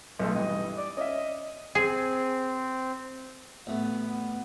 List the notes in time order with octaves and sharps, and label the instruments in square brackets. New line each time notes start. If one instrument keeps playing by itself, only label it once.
[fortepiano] B1 A3 [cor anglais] G#3
[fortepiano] G2 E3 [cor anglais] D#5
[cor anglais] D5
[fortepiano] C#4 E5 [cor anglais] D#5
[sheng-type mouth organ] C4 [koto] G#4
[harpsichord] A1 A3 [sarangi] B3